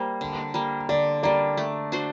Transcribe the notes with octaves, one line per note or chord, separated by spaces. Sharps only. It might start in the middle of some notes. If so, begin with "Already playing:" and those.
Already playing: G3 A#3 C5
D3
G3 A#3
D3 D5
G3 A#3 D5
A3
D4 F#4 C5